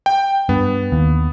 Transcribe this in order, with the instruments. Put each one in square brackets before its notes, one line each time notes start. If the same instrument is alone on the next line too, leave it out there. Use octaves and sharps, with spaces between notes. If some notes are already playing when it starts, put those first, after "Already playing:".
[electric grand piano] G5
[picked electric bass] G2 [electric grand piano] B3
[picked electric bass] D#2